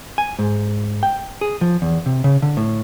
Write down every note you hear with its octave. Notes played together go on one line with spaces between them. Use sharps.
G#5
G#2
G5
G#4
F3
E2
C3
C#3
D3
A2